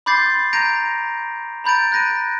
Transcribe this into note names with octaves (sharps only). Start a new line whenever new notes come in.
B5 C6 D6 G6 A6 C7
A#5 G6 A#6 D7 D#7 F7
A#5 B5 G6 A6 D7
F#6 G6 A#6 D7 D#7